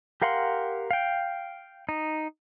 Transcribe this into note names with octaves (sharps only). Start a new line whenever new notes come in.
G4 A#4 F5 F#5 C6
F5 G5
D#4